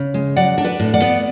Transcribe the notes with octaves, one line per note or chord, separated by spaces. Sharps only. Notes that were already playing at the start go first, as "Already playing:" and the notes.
Already playing: C#3
G#3
F#3 D5 F#5
D4
B4 D5
A2
D5 F#5
B3